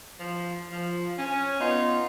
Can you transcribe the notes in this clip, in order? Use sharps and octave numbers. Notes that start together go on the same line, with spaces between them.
F3
F3
C#4
B3 D#4 F4